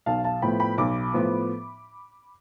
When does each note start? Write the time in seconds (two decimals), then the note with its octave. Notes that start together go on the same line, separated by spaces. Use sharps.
0.06 B1 F5 A5
0.24 F5 A5
0.42 A2 F3 B3 G5 B5
0.60 G5 B5
0.78 B1 B5 D6
1.14 A2 F3 B3